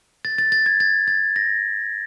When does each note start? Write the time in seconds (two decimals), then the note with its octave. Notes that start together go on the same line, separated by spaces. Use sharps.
0.25 A6
0.38 A6
0.52 A6
0.66 G#6
0.80 A6
1.08 A6
1.36 A#6